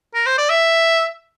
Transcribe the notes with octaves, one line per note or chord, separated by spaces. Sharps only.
A#4
C5
D5
E5